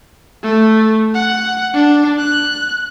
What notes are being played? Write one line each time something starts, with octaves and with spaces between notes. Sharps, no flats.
A3
F#5
D4
F#6